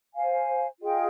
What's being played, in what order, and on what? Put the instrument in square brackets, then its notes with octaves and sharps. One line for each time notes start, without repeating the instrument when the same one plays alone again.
[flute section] C5 F5 G#5
F4 G#4 D#5 G5